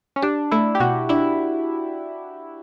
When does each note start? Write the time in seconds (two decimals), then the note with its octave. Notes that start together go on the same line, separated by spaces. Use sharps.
0.16 C#4
0.22 D4 G4
0.51 A3 E4
0.75 G4
0.80 B2 F#4
1.09 D4 E4